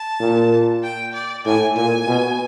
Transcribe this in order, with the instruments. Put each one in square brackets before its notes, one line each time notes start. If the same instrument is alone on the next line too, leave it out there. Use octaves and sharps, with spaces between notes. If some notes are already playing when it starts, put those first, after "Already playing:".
Already playing: [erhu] A5
[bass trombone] A#2
[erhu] G5
D5
[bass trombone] A2 [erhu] G#5
[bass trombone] A#2 [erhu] G#5
[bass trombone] B2